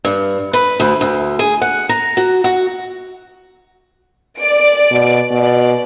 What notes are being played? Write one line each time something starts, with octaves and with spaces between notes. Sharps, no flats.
G2
B4
D2
D2
G#4
F#5
A#5
F#4
F#4
D5 D7
B2
B2 D5